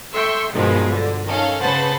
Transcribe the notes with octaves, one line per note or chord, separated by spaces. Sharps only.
A4 E5 G5 C6 C#6
G2 B2 D#3 F3 F#3 G#3
D3
D#3 C#4 A4 F5
C#3 B4 C5 F#5 A5 A6